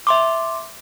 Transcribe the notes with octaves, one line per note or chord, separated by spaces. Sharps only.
E5 C6 D6